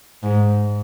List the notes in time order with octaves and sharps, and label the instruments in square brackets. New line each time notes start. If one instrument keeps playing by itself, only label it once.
[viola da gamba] G#2